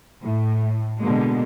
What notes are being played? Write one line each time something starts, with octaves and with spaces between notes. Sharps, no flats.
A2
B2 D3 G#3 A#3